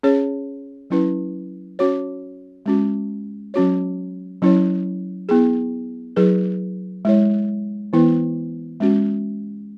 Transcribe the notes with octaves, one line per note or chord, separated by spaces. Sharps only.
C#4 G#4 C#5
F#3 C#4 E4 B4
C#4 F#4 C#5
G#3 C#4 F#4
F#3 C#4 F#4 C#5
F#3 C#4 E4 C#5
B3 E4 G#4
F#3 E4 G#4 B4
G#3 E4 C#5
E3 B3 E4 B4
G#3 C#4 F#4